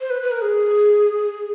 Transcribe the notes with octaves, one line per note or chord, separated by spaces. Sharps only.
C5
B4
B4
A#4
G#4